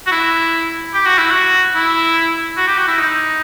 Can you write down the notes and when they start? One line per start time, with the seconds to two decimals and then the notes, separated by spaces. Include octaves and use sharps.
0.07 F#4
0.12 E4
0.94 G4
1.06 F#4
1.18 E4
1.30 F#4
1.75 E4
2.57 F#4
2.67 G4
2.77 F#4
2.87 E4
2.98 D#4